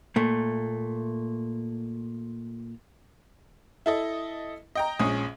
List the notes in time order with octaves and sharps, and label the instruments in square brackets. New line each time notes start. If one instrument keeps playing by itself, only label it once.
[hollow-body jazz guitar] A#2 A3
[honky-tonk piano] E4 A4 D#5
D#5 G5 A#5
A#1 G#3 C#4 G#5 D#6